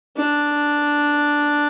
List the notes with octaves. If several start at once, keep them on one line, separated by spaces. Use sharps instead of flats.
D4